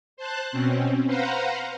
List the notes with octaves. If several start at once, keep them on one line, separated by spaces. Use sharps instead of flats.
C5 A5 F#6
B2 C4 C#4
B4 C5 F5 F#5 A#5